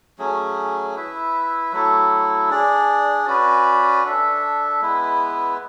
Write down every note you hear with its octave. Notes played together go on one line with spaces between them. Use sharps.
F#3 A3 C#4 G#4
E4 B4 E5
F#3 A3 E4 A4
D4 G#4 D5
C#4 F#4 B4 D5
D4 A4 E5
G#3 B3 E4 B4